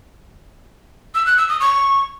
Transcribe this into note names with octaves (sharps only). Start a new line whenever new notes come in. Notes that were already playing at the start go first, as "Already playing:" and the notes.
E6
F#6
E6
D#6
C#6